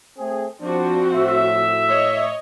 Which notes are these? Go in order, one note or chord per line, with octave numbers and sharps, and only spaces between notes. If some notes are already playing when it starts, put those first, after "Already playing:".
A3 C4 G#4
F3 C4 D4 F#4
A2 E5
C#5 D#5